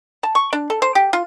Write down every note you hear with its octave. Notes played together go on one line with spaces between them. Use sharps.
A5
C#6
D4
A4
C5
G4
F4